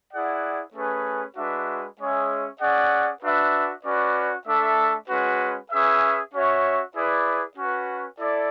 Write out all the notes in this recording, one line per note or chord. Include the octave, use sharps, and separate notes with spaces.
E4 G#4 D5 F#5
A3 C#4 G#4 B4
G#3 D4 F#4 B4 E5
G#3 C#4 G#4 C#5 E5
C#4 G#4 D5 F#5
D4 F#4 B4 E5
C#4 F#4 B4 D5
A3 D4 A4 E5
G#3 C#4 F#4 B4
C#4 G#4 B4 E5
C#4 F#4 C#5 E5
E4 G#4 B4 D5
C#4 F#4 B4
E4 A4 D5